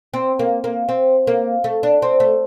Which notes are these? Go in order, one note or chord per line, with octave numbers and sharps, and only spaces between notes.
C4
A#3
A#3
C4
A#3
A3
D4
C4
A3